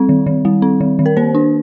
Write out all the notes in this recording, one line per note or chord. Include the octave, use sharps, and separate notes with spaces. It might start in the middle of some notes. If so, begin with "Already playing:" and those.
Already playing: G3 C4
D#3
D#3
G3
C4
D#3
D#3
A#4
A#3 C5
D4